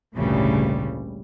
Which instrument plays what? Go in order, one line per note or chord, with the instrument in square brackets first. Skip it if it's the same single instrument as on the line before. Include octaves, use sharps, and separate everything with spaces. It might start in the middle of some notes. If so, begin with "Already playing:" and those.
[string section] G#1 D2 A#2 C#3 E3 G3